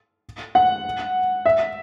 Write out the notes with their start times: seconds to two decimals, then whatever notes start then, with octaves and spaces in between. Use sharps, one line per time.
0.55 F#5
1.46 E5